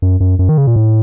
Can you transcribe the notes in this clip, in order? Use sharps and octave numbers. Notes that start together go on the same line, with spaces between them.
F#2
F#2
F#2
D#3
C#3
A#2
A2